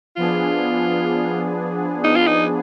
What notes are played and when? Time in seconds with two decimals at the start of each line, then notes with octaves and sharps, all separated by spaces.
0.17 F3 B3 D4 F4 G#4
2.05 D#4
2.16 F4
2.27 D#4